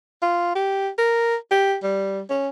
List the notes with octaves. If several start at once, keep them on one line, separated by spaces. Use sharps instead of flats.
F4
G4
A#4
G4
G3
C#4